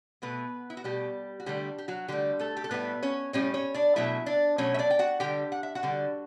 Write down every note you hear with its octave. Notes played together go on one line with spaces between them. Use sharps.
B2 A3 B3 B4
E4
F#4
B2 G3 A3 G4
F#4
D3 G3 A3 G4
G4
F#3 F#4
D3 G3 A3 G4
A3 A4
G4
A4
A2 G3 B3 B4
C#4 C#5
A2 G3 C#4 C#5
C#4 C#5
D4 D5
B2 F#3 A3 E4 E5
D4 D5
B2 F#3 A3 C#4 C#5
E5
D4 D5
G5
F#4 F#5
D3 G3 G4 G5
F#5
E5
F#4 F#5
D3 G3